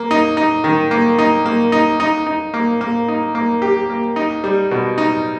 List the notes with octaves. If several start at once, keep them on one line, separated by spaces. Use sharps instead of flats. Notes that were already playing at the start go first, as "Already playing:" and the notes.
Already playing: A#3
D#4
D#4
D#3
A#3
D#4
A#3
D#4
D#4
D#4
A#3
A#3
D#4
A#3
G4
A#3
D#4
G3
B2
D#4